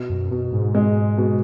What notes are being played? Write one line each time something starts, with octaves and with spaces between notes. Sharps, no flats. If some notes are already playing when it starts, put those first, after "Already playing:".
Already playing: B2
F#2
B2
G#2
G#3
B2